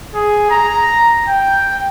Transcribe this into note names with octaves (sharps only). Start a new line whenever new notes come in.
G#4
A#5
G5